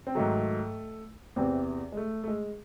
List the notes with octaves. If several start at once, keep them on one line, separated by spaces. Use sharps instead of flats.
C4
G#2 D#3 F#3 A3
E2 C3 E3 C4
G#3
A3
A3
G#3